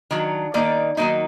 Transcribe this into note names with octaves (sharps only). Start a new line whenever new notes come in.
D#3 F#3 D4
D#3 A#3 D#4 D5
D#3 F#3 A#3 D#4